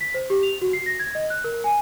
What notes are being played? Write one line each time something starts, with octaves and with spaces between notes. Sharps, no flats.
B6
C5
G4
F7
F#4
C7
A#6
G#6
D#5
F#6
A#4
G#5